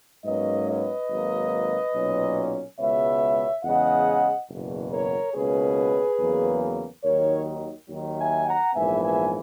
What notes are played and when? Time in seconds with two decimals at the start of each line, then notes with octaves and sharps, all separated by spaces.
0.25 G#2 F#3 A#3 C#4 B4 D#5
0.67 B4 D#5
1.09 G#1 G#2 F#3 A#3
1.94 B1 A#2 F#3 C#4
2.79 C#2 B2 G#3 B3 C#5 E5
3.64 E2 C#3 G#3 D#5 F#5
4.50 F#1 E2 B2
4.91 A#4 C#5
5.34 C#2 B2 A#3 C#4 G#4 B4
6.19 E2 C#3 F#3 A#3
7.04 D#2 D#3 F#3 A#4 C#5
7.89 D#2 D#3 F#3
8.17 E5 G#5
8.46 F#5 A#5
8.74 A#1 G#2 E3 B3 E5 G#5
9.02 E5 G#5